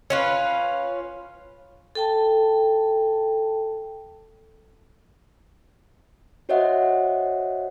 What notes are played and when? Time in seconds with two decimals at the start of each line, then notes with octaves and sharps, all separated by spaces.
0.10 C#4 F4 B4
1.95 A4 G5 A5
6.49 F#4 C5 C#5 D#5 E5 F#5